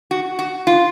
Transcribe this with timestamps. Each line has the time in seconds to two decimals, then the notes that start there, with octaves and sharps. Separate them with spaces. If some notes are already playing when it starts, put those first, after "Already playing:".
0.11 F#4
0.39 F#4
0.67 F4